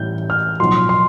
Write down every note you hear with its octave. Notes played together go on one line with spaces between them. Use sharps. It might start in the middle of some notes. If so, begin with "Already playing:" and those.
Already playing: A1 A2 G3 G6
F6
B1 A2 F3 C6
C6